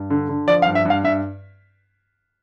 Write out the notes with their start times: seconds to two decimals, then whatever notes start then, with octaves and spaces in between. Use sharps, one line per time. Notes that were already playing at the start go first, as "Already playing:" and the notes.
Already playing: G2
0.10 D3
0.29 D3
0.48 F3 D5
0.62 F5
0.66 G2
0.75 E5
0.85 G2 F5
1.04 G2 E5